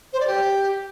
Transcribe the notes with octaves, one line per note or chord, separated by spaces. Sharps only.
C5
D5
G4